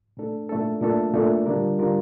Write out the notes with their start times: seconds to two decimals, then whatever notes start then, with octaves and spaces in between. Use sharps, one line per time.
0.17 A#2 A3 D4 A4
0.49 A#2 A3 D4 A4
0.81 A#2 A3 D4 A4
1.14 A#2 A3 D4 A4
1.46 D3 G3 D4 F4 A#4
1.78 D3 G3 D4 F4 A#4